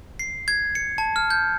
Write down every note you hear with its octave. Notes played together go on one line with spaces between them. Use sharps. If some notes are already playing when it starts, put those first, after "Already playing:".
C7
G#6
C#7
A5
F6
G6